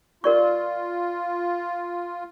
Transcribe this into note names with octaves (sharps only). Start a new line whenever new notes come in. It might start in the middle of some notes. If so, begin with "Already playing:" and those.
F4 A#4 D5 C#6